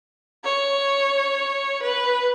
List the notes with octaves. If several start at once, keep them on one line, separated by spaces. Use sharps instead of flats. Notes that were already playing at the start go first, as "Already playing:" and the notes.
C#5
B4